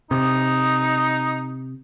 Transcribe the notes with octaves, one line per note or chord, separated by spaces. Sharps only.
C3 D#4 D#6